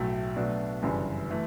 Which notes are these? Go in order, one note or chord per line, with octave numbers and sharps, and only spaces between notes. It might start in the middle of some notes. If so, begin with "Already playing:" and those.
Already playing: B1 A2 F#3 A3
B2 F#3 A3 D4
G1 F#2 C#3 E3 G3
E3 A3